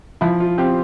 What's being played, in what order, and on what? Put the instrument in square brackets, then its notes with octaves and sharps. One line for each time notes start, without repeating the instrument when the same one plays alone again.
[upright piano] F3 [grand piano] E4
[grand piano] F4
[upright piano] C4 [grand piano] G4